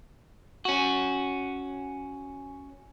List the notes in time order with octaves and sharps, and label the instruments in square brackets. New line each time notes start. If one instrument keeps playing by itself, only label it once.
[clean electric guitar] C#4 F#4